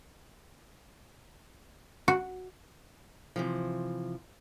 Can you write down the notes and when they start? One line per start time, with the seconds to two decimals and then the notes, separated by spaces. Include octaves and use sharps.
2.08 F#4
3.36 C3 E3 F3